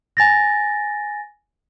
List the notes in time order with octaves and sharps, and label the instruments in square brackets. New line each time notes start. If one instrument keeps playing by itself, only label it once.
[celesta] G#5 A6 A#6